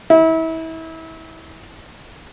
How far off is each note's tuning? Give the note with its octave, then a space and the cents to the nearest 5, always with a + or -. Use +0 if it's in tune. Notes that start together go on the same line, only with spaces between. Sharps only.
E4 -30